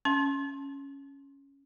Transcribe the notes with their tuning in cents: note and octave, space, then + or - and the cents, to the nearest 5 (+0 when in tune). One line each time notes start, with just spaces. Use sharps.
C#4 +0 C6 +20